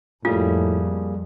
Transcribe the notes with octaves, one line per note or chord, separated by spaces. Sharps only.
F2 A2 G3 A#3 F4 G#4